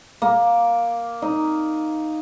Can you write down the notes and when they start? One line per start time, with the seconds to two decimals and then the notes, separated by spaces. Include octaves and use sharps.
0.22 A#3
1.22 D#4